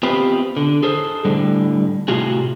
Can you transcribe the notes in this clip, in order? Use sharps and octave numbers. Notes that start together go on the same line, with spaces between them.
B3 C4 F4 G4 B4 C5
D3
G#4 A4 C5
A2 D3 G3
A2 C3 F4 F#4 G#4